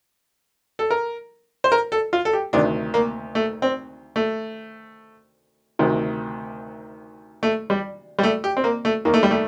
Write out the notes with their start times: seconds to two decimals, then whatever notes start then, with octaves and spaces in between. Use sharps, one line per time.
0.79 A4
0.91 A#4
1.64 C5
1.72 A#4
1.92 A4
2.13 F4
2.25 A4
2.33 G4
2.53 D2 C3 D#3 D4
2.94 A#3
3.35 A3
3.62 C4
4.16 A3
5.79 D2 C3 D#3
7.43 A3
7.70 G3
8.19 G3
8.23 A3
8.44 G4
8.57 C4
8.64 A#3
8.85 A3
9.05 D#2 D#3 A#3
9.14 A3
9.23 G3
9.31 A3